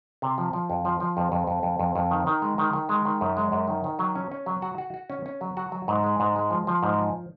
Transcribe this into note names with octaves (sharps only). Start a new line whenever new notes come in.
C3
F3
F3
F2
F3
F3
F2
F2
F2
F2
F2
F2
D#3
D#3
G#3
D#3
D#3
G#3
D#3
F#2
G#3
F#2
D#3
D#3
F#3
C#4
C#4
F#3
F#4
F#4
F#4
C#4
C#4
F#3
F#4
F#3
G#2
G#3
G#2
G#3
F3
F3
G#2
F3